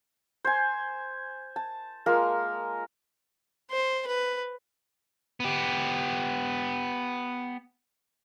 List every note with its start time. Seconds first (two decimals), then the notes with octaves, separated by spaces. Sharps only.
0.45 C5 G#5
1.56 A5
2.06 G#3 A#3 F4 A#4
3.71 C5
4.07 B4
5.40 B3 G4